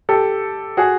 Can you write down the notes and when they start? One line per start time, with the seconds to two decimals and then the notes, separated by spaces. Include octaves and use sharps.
0.09 G4 A4
0.77 F#4 G#4